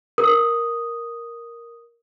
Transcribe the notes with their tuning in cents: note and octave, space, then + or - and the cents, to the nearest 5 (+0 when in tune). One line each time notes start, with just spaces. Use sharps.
A#4 +0 D#6 +0